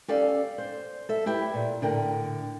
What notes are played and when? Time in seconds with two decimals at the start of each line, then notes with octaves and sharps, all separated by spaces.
0.08 C#4 G4 A4 D5 F5
0.58 C5
1.09 A4 E5
1.26 E4 G4 B4 E5
1.54 A#2
1.82 A2 D3 A#4 G5